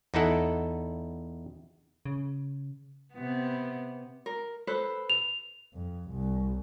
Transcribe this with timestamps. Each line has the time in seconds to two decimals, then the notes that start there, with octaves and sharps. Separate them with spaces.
0.14 E2 D#4 E4 A4 F#5
2.06 C#3
3.13 C3 B3
4.26 A#4
4.67 A4 B4 C5
5.10 F7
5.74 F2
6.09 C2